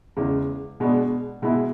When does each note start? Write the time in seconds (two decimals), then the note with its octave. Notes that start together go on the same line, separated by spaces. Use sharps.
0.17 E2 C#3 G#3
0.80 B2 G#3 B3 D4
1.42 B2 G#3 B3 E4